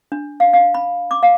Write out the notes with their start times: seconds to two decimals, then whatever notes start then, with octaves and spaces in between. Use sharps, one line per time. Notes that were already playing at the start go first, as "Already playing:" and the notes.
0.12 D4
0.40 F5
0.53 F5
0.74 B5
1.11 D6
1.23 F5